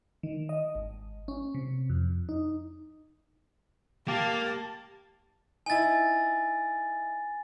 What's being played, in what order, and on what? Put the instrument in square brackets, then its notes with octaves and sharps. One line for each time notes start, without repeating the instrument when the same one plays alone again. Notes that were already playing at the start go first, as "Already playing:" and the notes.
[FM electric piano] D#3
D#5
G#1
C#4
C3
F2
D#4
[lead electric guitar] A#3 [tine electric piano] G4 F5 A6 [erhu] A5
[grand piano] D#4 E4 [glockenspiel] G#5 A6